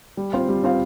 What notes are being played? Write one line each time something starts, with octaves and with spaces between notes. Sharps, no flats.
G3
C4 F4 C5 F5
G3
C4 F4 C5 F5